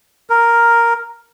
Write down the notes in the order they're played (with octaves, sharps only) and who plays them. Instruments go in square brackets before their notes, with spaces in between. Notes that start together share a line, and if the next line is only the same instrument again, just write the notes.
[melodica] A#4